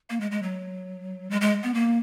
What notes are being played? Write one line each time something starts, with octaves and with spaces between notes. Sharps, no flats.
A#3
G#3
G#3
F#3
G#3
G#3
B3
A#3